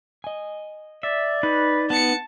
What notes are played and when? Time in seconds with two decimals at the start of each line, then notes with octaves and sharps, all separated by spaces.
0.24 D#5 G#5
1.03 D5 E5
1.43 D#4 B4
1.90 B3 A5 C#7